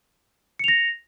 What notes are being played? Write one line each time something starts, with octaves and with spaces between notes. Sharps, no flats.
A#6 C#7 F7